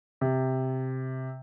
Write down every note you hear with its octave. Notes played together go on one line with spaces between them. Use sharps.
C3